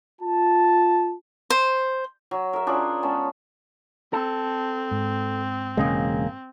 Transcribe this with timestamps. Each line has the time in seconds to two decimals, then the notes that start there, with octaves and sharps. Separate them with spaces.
0.22 F4 A5
1.50 C5
2.31 F#3
2.53 A#4 E5
2.67 C#4 D4 F4 G#4
3.03 G#3 B3 C#4 A5
4.13 C4 A4
4.91 G#2
5.77 E1 C#3 G#3 A#3 G#4